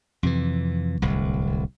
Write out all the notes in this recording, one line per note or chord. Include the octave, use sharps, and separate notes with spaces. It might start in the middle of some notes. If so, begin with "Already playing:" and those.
F2 C3 E3
D1 C2